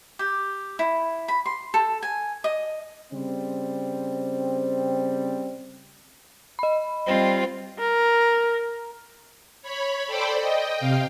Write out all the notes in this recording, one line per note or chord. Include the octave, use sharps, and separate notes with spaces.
G4
E4
B5
C6
A4
G#5
D#5
C#3 G3 C4
D#5 B5
G3 C4 F4
A#4
C#5 B5
A4 C5 D5 G5 B5
D#5 G5
C3 F5 G5